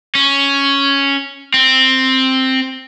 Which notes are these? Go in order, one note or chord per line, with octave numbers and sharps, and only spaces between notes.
C#4
C4